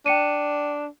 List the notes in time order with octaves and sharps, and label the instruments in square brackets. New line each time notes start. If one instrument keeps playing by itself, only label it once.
[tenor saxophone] D4 [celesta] G5 C#7 D#7